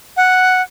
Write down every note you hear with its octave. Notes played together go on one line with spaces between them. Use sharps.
F#5